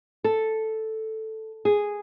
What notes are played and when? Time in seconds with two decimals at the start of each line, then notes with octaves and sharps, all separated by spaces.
0.24 A4
1.65 G#4